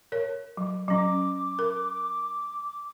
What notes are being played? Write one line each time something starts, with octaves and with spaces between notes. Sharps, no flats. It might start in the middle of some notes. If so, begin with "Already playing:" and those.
A#4 C#5
F#3
F#3 C#4 D6
A#4